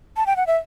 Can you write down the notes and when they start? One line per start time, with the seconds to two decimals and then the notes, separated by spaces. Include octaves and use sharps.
0.17 A5
0.26 G5
0.36 F#5
0.47 E5